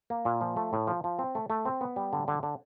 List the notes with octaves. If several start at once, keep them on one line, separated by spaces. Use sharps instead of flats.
A#3
A#2
F3
A3
A2
F3
F3
C4
A3
A3
C4
B3
G3
D3
D3
D3